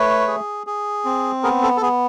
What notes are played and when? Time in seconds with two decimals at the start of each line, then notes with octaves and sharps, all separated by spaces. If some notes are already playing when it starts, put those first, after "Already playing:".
Already playing: A3 B4 C#5
0.28 G#4
0.67 G#4
1.05 C4
1.43 B3 G#4 A#4
1.63 A4
1.77 A4
1.81 B3 G#4